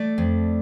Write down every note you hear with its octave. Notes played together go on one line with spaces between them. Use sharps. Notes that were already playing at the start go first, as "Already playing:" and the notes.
Already playing: A3 D5
F2